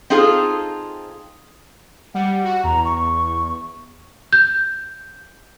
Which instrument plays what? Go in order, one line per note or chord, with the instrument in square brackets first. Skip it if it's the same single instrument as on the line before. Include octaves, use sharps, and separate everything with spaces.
[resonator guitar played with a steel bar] C4 D#4 F4 G#4 A4
[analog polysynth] G3 [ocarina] F#5
[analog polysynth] F#4
[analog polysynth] E2 [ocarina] A#5
[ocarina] C#6
[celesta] G6